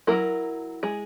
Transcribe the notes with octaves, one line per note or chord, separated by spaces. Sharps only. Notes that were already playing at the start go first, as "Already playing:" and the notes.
F#3 A#3 E4 A#4
G#3 G#4